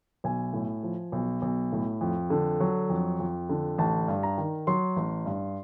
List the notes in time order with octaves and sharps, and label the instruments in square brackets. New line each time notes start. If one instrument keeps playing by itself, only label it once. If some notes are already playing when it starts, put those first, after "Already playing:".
[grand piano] B1 G#5
A2
F3
B1
B1
A2
F2
D3
F#3
F2
F2
D3
A1 A5
G2
A#5
D#3
F#3 C6
A1
G2